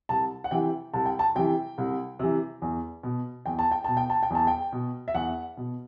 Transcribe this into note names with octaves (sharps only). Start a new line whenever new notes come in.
C2 A5
F#5
C3 E3 G5
C2 A5
G5
A5
C3 E3 G5
C2
C3 E3
E2
B2
E2 G5
A5
G5
B2 A5
G5
A5
G5
E2 A5
G5
B2
E5
E2 F#5
B2